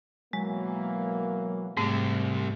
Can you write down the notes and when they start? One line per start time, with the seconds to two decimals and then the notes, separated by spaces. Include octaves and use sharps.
0.33 B2 E3 F#3 G#3 A#3
1.77 G#2 C3 G3 A3